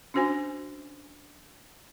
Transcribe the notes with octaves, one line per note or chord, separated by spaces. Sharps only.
C#4 D4 F#4 C5 G#5